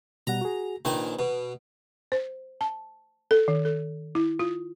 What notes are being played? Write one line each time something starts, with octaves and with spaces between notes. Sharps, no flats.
B2 G3 F#5 A#5
F#4 G#4
A#1 D#3 B4 G#5
B2
C5
A5
A4
D#3
A4
E4
F4